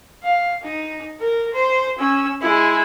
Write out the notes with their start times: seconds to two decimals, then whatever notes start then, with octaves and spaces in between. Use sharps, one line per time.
0.23 F5
0.64 D#4
1.20 A#4
1.54 C5
1.99 C#4 E6
2.42 G#3 E4